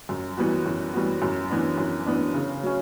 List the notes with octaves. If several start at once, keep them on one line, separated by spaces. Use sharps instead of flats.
F#2
E3 G3 B3 F#4
F#2
E3 G3 B3 F#4
F#2
E3 B3 D4
F#2
E3 B3 D4
C#3
F#3 C#4